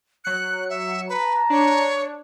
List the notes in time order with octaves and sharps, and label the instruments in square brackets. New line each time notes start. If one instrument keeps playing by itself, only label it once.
[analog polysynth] F#3 C#7 [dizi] F#6
[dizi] E5
[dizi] B4 [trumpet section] A5 A#5
[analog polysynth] D4 [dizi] C#5